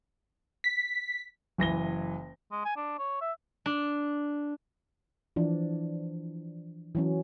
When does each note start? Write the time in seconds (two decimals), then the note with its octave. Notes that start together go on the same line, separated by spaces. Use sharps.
0.64 B6
1.58 F#1 E3 A#6 G7
2.51 G#3
2.65 G#5
2.76 D4
2.98 C#5
3.21 E5
3.66 D4
5.36 E3 F3 D4
6.95 E3 F#3 C#4